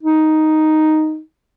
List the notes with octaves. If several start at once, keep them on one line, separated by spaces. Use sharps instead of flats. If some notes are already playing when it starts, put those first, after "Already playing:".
D#4